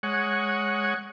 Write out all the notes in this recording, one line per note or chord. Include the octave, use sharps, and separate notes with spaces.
G#3 C#5 F#5